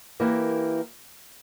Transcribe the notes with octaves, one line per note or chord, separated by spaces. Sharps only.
E3 A#3 E4 G4 A#4